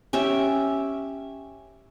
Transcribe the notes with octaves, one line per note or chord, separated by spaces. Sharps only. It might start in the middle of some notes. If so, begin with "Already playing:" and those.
C#4 G4 E5